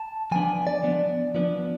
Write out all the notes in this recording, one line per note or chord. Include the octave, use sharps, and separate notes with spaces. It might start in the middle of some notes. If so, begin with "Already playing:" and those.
Already playing: A5
F3 B3 D4 G#5
D5
F3 B3 D4
F3 B3 D4